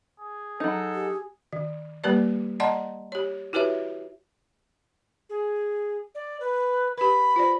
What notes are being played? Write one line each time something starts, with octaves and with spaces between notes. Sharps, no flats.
G#4
F#3 D#4 A4
G4
D#3
G3 A#3 G4 B4 D5
D5 D#5 F#5 A5 A#5 C6
G4 C#5
E4 F#4 G4 B4 C#5 E5
G#4
D5
B4
G4 B4 B5
F4 C5 D5